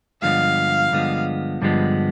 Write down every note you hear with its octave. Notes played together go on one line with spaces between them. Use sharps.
G2 D3 F3 G#3 B3 F5
G2 D3 F3 G#3 B3
G2 D3 F3 G#3 B3